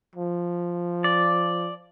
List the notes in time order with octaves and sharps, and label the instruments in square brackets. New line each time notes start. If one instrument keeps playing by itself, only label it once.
[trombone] F3
[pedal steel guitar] D5